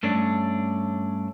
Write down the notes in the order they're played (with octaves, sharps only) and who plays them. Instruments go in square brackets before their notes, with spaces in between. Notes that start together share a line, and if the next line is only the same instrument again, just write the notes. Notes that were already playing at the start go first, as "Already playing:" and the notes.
[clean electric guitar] G2 A3 C#4 D4